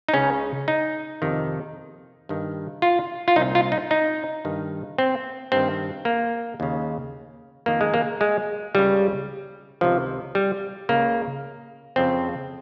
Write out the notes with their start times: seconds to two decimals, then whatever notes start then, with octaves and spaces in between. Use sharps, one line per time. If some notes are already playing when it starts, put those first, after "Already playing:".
0.09 D#4
0.14 C#2 C#3 C#4
0.68 D#4
1.22 F2 C3 D#3
2.29 G2 D#3
2.82 F4
3.28 F4
3.36 C2 A#2 D#4
3.55 F4
3.72 D#4
3.91 D#4
4.45 G2 D#3
4.98 C4
5.52 G2 D#3 C4
6.05 A#3
6.60 D#2 C#3
7.66 F2 D#3 A#3
7.81 G#3
7.94 A#3
8.21 G#3
8.74 C#2 C#3 G3
9.81 C#2 C3 D#3 F3
10.35 G3
10.89 C#2 C#3 A#3
11.96 F2 C#3 C4